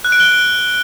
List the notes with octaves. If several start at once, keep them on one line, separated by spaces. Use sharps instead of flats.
F#6
D7
G7